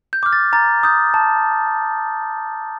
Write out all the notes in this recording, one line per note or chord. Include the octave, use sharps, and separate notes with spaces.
G6
D6 F6
A6
A#5 A6
D#6 G6
A5